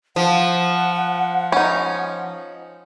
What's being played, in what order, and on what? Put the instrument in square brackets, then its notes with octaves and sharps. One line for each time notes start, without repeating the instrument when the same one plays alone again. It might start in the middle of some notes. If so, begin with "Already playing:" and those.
[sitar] F3 [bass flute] F#5
[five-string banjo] C#4 D#4